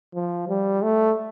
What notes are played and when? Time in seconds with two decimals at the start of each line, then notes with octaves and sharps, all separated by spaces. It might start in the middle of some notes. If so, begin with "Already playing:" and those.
0.14 F3
0.49 G3
0.83 A3